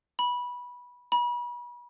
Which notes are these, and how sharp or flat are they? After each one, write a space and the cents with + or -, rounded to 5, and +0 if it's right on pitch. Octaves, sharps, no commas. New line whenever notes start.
B5 -15
B5 -35